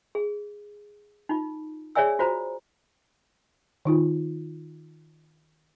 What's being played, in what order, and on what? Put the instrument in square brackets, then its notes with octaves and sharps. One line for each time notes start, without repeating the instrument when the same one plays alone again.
[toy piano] G#4
D#4 F4
G#4 C#5 D5 E5 G#5 E6
F4 F#4 C5 A#5
[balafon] D#3 D#4 F4